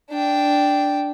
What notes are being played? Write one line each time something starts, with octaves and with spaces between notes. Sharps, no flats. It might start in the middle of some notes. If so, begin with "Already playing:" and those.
D4 G5